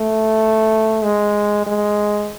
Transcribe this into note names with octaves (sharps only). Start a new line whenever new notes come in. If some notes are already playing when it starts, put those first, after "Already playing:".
Already playing: A3
G#3
G#3